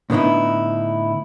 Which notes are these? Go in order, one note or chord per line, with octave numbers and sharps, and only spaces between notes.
A2 D3 B3 D#4 E4